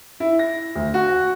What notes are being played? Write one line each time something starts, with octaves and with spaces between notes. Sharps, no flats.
E4
A#6
D2
F#4